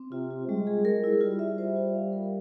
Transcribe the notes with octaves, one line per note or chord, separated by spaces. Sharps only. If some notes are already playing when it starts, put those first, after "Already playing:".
Already playing: C4
C3 F4
F4
G3 G#3
G#4
G#3 A#4
E4
G3 F4
E5
C5
F4
F5
A#4